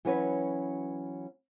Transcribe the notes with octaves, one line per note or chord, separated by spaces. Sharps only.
E3 F#3 C#4 F#4 B4 C#5